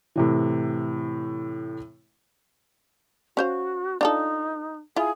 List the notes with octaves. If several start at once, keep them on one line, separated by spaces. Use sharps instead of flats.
A2 C3 E3
C#4 F#4 C5 F5
D4 D#4 F4 A4
E4 F4 G#4